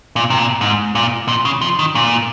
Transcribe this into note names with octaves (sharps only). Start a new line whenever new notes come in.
A#2
C3
A#2
G#2
A#2
A#2
C#3
F3
D#3
A#2